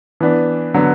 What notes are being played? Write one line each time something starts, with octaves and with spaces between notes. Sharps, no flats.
E3 B3 D4
D3 F#3 B3